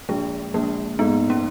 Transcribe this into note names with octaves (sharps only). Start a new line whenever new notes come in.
A#1 G#3
A#1 A#3
G#2 B3
C#4